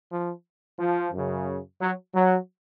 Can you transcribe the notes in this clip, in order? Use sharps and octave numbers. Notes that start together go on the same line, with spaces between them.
F3
F3
F#2 C#3
F#3
F#3